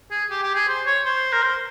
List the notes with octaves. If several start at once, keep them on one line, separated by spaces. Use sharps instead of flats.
G#4
G4
G4
G#4
C5
C#5
C5
A#4
C5